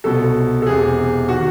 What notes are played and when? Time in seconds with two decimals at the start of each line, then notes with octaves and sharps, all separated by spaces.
0.04 C2 B2 A4
0.62 A4
0.66 E1 E2 C3 G#4
1.29 D#3 F#4